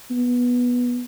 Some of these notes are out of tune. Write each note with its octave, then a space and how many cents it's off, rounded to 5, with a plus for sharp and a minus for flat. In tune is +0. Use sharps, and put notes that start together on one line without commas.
B3 -10